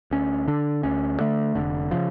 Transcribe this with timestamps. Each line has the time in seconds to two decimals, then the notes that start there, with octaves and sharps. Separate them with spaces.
0.11 D2 C#4
0.47 D3 D4
0.83 D2 C#4
1.20 D3 A3
1.55 F1 D3
1.91 C#3 F3